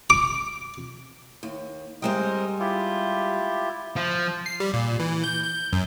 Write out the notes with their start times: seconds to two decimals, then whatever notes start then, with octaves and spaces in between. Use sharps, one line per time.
0.10 D6
1.43 D#2
2.02 G3 G#3 C4 A#4 D#5 G5
2.60 E4 F4 G4
3.96 F3
4.46 C7
4.60 G3
4.74 A#2
5.00 E3
5.24 G6
5.43 G6
5.73 F#2